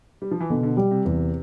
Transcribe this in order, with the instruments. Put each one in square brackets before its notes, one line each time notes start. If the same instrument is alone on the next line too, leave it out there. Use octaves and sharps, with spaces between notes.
[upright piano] G3
F3
E3
[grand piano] B2 [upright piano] D3
[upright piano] D3
[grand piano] G3
[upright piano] C3
[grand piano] E2